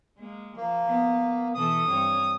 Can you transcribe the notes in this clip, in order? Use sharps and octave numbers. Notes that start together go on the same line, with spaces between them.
G#3 A#3
F3 A#3
B3
B2 E3 A4 D#6
G2 C4 C#5